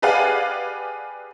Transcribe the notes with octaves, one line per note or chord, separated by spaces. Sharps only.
G4 G#4 B4 D5 F5 F#5